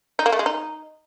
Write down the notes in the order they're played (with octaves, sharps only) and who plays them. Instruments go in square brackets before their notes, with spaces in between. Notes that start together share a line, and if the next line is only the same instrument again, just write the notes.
[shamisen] D#4
A#3
A3
G#3
D#4